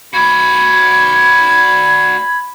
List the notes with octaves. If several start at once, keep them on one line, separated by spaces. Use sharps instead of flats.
F#4 D5 B5 G#6